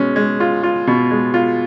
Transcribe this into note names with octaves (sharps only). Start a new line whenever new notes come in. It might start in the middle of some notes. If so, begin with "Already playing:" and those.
Already playing: B2 G#3 C#4
G#3
F4
F4
B2
G#3
F4